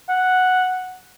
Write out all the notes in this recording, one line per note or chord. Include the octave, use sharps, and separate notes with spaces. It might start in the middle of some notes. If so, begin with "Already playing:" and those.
F#5